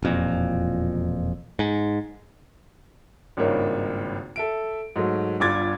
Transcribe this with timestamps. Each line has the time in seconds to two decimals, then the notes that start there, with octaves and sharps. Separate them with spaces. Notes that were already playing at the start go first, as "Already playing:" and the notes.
0.03 E1 F2 A#2
1.59 G#2
3.37 G#1 C#2 G2 D#3 A#3 C#5
4.36 A4 E5 D7
4.96 G#2 F#3 A3
5.40 G1 G2 F4 D6 G#6 A6